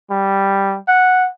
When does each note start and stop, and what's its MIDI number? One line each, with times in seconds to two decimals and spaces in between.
0.11 0.78 55
0.88 1.29 78